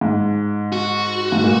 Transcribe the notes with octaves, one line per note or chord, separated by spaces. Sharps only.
G#2
F#4
G#2
A#2